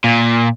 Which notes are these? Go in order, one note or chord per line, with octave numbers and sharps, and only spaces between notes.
A#2